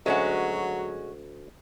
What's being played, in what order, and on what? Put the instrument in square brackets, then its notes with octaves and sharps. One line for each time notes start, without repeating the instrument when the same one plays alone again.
[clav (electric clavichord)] D2 [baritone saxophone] F#3 [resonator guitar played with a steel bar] G#3 C#4 F#4